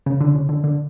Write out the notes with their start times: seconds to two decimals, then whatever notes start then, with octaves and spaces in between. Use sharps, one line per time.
0.06 C#3
0.21 D3
0.35 C#3
0.49 D3
0.64 D3